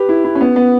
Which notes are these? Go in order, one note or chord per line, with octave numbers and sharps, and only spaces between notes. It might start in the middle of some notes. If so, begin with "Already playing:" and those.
Already playing: G4 B4
E4
E4
C#4
B3
B3